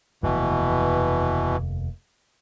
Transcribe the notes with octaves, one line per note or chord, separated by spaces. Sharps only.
F1 D#2 B2 E3